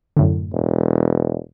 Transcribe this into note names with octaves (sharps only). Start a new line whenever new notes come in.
F#2 A2 D3
E1